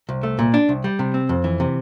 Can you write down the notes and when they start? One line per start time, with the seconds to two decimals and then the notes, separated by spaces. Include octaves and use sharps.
0.09 C2
0.23 A3
0.39 A#2
0.54 D4
0.69 C2
0.84 G3
0.99 C3
1.14 C4
1.29 F2
1.44 E3
1.60 C3